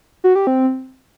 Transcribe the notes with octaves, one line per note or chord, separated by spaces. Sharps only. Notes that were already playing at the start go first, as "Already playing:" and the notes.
F#4
G4
C4